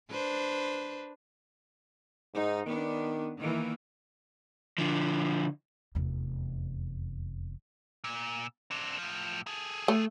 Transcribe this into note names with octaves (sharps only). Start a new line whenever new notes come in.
D4 B4 C5
G#2 D#4
D#3 B3 D4
D#3 E3 A#3
D3 F3
F1 E2
A#2
C4 D4
A2 F3
G#4 A4
A3